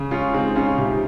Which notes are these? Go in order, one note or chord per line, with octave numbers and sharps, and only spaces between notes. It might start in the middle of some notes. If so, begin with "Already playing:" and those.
Already playing: C#3
G#3 C#4 F4
G#3 C4 D#4
C#3 C#4 F4
C3 D#4 G4